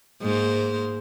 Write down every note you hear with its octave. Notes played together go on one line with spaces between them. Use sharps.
G#2 A#3 C5